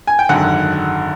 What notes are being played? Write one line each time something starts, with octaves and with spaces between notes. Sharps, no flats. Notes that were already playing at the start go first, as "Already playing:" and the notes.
G#5
G5
G#1 F#2 D3 F#5